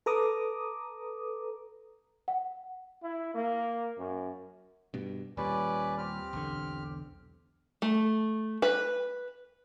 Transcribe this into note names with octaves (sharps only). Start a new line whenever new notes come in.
A4 B4 A#5 D6 D#6
F#5
E4
A#3
F#2
G2 B2
D#2 A#2 G3 C#4 B4 D5
C4 G4 F6
B1 E2 D3
A3
B4